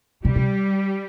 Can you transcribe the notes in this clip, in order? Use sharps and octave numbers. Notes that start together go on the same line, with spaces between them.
C3 G3
C3